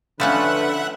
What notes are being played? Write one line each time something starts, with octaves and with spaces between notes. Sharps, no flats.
D3 F3 A3 C#4 B4 E5 F#5 F#6